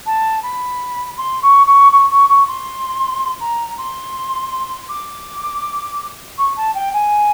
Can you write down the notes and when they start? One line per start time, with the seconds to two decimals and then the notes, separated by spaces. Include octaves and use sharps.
0.06 A5
0.43 B5
1.18 C6
1.42 C#6
1.66 C#6
1.92 C#6
2.10 C#6
2.29 C#6
2.48 C6
3.40 A#5
3.78 C6
4.89 D6
6.38 C#6
6.57 A5
6.75 G5
6.93 G#5